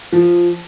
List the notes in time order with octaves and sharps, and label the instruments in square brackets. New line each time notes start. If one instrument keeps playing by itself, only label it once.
[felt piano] F3